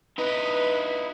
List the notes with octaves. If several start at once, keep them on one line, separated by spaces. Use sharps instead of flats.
D#4 E4 B4 D#5